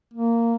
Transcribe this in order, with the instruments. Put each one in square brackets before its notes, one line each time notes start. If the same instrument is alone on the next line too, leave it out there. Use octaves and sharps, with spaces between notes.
[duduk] A#3